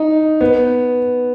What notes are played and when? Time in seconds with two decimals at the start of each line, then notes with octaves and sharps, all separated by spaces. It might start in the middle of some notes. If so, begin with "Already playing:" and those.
Already playing: D#4
0.41 B3